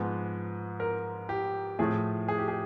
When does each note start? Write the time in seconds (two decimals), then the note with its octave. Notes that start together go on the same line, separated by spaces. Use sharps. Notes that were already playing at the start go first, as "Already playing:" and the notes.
Already playing: G#2 F3 G#3 B3
0.80 A#4
1.29 G4
1.79 A2 F3 A3 G#4
2.28 G#4
2.38 G4
2.48 G#4